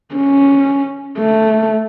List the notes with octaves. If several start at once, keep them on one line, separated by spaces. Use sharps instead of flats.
C#4
A3